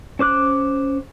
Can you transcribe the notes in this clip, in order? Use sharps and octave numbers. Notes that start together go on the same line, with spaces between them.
C#4 C5 D6 F#6